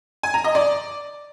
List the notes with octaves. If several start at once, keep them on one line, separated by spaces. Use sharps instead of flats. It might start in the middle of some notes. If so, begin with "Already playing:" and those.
G#5
A#5
D#5
D5